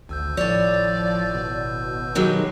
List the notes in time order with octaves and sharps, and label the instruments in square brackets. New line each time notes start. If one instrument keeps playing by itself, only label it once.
[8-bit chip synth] G#1 E6 G6 [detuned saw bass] D2
[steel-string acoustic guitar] A2 C#5 [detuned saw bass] F3 [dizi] D5
[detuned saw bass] B2
[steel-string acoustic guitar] D#3 F#3 G#3 [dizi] G4